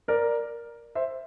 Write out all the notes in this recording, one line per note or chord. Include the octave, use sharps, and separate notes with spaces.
A#4 D5
C5 E5